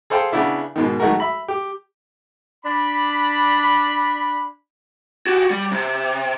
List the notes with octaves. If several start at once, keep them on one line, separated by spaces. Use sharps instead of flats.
G#4 A4 C5 F5 G5
C#3 B3 D4 E4
G#2 B2 D#3
D#3 F#3 G#3 A3 F#4 A#4
E5 B5
G4
D4 B5
F#4 G4
G3
C3